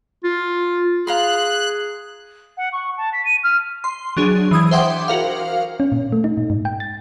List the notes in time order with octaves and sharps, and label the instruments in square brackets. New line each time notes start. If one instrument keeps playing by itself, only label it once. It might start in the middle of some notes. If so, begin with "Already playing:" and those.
[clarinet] F4
[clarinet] G#4 [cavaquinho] F5 A#5 C6 [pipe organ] F#6
[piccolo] F#5
C#6
A5
B6
D#7
F6
[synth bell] C6
F#3 D4 G#4
E3 D#6 G#6
C5 E5 F#5 G5 C6 D6
F#4 A#4 F5
[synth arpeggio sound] C#4
A#2
A3
D#4
A#2
G#2
G5
A6